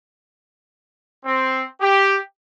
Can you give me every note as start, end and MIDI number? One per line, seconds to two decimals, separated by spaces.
1.26 1.63 60
1.81 2.17 67